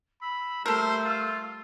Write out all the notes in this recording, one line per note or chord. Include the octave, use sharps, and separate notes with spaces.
B5 E6
G3 A3 A4 A#4 C5
F4